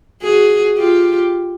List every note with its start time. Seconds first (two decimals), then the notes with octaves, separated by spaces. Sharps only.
0.22 F#4 G#4
0.78 F4 G4